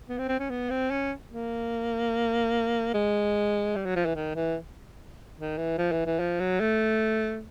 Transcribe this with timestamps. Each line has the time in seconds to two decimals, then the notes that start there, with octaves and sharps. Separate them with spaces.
0.09 B3
0.18 C4
0.28 C4
0.39 C#4
0.50 B3
0.70 C4
0.91 C#4
1.31 A#3
2.94 G#3
3.75 G3
3.85 F#3
3.96 F3
4.06 E3
4.16 D#3
4.35 E3
5.38 D#3
5.58 E3
5.78 F3
5.92 E3
6.06 E3
6.19 F3
6.40 F#3
6.60 A3